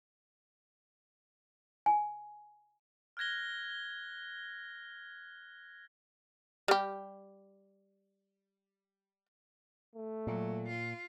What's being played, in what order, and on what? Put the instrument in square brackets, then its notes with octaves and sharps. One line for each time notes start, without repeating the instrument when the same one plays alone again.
[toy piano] G#5
[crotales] F6 F#6 G#6 A#6 G7
[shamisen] G3 G4
[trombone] A3
[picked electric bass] A#2 [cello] F#3
[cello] F4